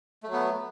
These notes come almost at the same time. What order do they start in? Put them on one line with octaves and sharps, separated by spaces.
A3 F#3 B3